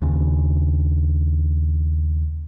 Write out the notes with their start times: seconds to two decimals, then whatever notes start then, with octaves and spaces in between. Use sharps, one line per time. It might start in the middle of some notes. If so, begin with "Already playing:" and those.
0.02 D#2 C#3